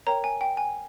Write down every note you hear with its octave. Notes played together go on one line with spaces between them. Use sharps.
A#4 C#5 G5 A#5
G#5
G5
G#5